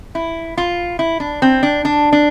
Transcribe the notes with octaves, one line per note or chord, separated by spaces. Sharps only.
E4
F4
E4
D4
C4
D4
D4
D4